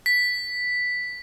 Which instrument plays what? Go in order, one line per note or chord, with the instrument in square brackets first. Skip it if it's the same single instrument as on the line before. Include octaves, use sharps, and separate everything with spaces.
[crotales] B6